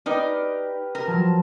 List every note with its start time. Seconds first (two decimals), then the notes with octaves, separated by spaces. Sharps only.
0.06 D#4 G4 A#4 B4 D5
0.95 A#4
1.07 F3 F#3 A5